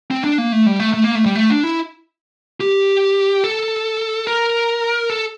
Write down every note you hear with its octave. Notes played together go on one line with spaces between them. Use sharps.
C4
D4
A#3
A3
G3
A3
A3
A#3
A3
G3
A3
D4
E4
G4
A4
A#4
A4